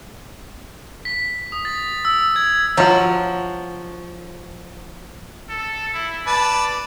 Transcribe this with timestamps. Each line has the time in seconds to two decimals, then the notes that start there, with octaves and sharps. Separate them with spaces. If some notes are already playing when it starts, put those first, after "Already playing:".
1.05 B6
1.52 D#6
1.65 A6
2.05 E6
2.36 G#6
2.77 F3 F#3 F#4
5.49 A4
5.94 E4
6.27 B4 D5 A5